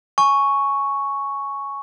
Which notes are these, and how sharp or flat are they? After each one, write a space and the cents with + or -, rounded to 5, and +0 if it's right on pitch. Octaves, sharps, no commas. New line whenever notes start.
G#5 +10 C#6 +0